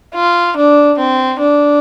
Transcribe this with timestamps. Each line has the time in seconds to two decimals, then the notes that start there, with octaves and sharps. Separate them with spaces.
0.15 F4
0.57 D4
0.98 C4
1.40 D4